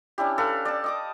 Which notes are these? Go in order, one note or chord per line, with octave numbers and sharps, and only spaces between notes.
C#4 D4 E4 G4
A4 B4 F5
D5 A5
D#5 D6 D#6